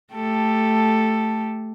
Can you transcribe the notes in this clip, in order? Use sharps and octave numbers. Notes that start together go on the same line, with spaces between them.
A3 G4 A4